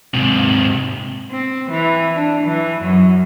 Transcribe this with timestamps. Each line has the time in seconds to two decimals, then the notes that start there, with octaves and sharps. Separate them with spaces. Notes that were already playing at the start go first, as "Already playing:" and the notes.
0.14 G#2 C3
1.31 C4
1.71 E3
2.15 D4
2.44 E3
2.82 F#2